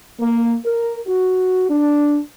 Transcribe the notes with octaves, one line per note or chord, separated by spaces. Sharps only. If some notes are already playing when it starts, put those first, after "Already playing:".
A#3
A#4
F#4
D4